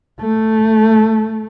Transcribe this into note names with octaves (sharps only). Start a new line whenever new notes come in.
A3